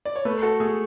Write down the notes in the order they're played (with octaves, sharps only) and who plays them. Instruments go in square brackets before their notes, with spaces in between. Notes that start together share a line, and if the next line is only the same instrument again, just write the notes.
[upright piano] D5
C#5
[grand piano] A3 [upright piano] B4
[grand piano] F#4 [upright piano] A4
[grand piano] A3 [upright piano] G#4